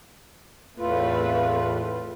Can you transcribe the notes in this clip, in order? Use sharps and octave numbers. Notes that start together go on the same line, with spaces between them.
E2 A2 A3 C4 F4 B4